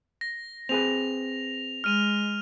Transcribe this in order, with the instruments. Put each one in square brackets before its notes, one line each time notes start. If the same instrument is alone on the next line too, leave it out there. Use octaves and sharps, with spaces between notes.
[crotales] A#6
[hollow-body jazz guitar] C4 G#4 B4 [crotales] F7
[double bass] G#3 [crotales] F6 D#7 F7